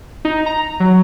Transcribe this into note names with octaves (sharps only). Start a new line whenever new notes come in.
D#4
A#5
F#3